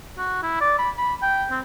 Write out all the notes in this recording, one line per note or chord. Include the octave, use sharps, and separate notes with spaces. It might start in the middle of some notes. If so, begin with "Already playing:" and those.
F#4
E4
D5
B5
B5
G5
C4